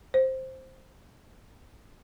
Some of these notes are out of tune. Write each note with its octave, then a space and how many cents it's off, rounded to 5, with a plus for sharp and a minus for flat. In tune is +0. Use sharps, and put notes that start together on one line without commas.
C5 +5